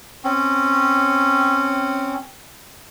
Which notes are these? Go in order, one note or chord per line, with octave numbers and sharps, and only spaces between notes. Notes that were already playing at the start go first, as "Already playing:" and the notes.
C4 C#4